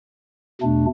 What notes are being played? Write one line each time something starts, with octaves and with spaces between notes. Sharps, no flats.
E2 B2 A3 D4